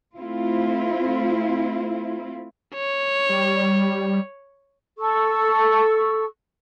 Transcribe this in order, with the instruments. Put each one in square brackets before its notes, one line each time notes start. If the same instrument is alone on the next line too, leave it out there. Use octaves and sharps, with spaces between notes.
[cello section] A3 C4 E4 F4
[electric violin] C#5
[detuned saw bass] G3
[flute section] A4 C#6 E6